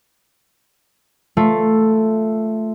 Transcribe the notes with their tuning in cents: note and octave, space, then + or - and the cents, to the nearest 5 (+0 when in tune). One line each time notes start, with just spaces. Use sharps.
A3 +0 F4 +0